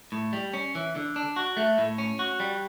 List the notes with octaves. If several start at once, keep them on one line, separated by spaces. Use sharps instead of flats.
A2
G3
C#4
E3
D3
D4
F#4
A3
A2
C#4
F#4
G3